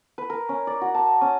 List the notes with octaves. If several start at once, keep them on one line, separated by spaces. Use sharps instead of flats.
B4
A#4
C#4
D5
F#4
A5
C#4